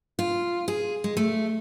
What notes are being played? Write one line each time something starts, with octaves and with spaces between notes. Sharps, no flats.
F4
G#4
G#3
A3